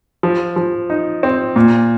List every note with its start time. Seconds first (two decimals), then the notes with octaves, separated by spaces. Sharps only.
0.23 F3
0.56 F3
0.90 D#4
1.23 C4
1.56 A#2